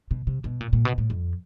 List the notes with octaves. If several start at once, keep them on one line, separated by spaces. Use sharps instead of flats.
B2
C3
B2
A#2
A#2
B2
A2
F2